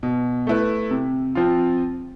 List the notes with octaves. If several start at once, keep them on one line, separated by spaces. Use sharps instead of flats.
B2
A3 E4 B4
C3
F3 C4 F4